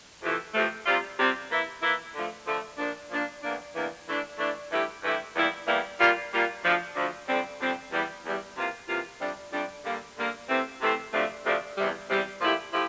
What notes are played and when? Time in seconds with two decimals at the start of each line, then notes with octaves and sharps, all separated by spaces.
0.22 F2 C3 E3 A3
0.54 F2 C3 E3 A3
0.85 C3 G3 C4 F4
1.17 C3 G3 C4 F4
1.49 E3 A#3 E4
1.82 E3 A#3 E4
2.14 D3 F3 A3
2.46 D3 F3 A3
2.78 A#2 F3 A#3 D4
3.10 A#2 F3 A#3 D4
3.42 E2 E3 A#3 D4
3.75 E2 E3 A#3 D4
4.07 E3 A3 D4
4.38 E3 A3 D4
4.70 G2 E3 A3 E4 G4
5.03 G2 E3 A3 E4 G4
5.35 E2 E3 G3 A#3 E4
5.67 E2 E3 G3 A#3 E4
5.99 A#2 G3 A#3 F4
6.31 A#2 G3 A#3 F4
6.63 D2 D3 F3
6.95 D2 D3 F3
7.27 F2 D3 G3 C4
7.60 F2 D3 G3 C4
7.92 E2 E3 G3
8.24 E2 E3 G3
8.55 C3 E3 A#3 F4
8.88 C3 E3 A#3 F4
9.20 F2 C3 G3 D4
9.52 F2 C3 G3 D4
9.84 D3 G3 A#3
10.16 D3 G3 A#3
10.48 C3 E3 A3 C4
10.80 C3 E3 A3 C4
11.12 D2 C3 F3 A3 D4
11.44 D2 C3 F3 A3 D4
11.76 E2 C3 G3
12.09 E2 C3 G3
12.41 A#2 F3 A3 E4 G4
12.73 F3 A3 E4 G4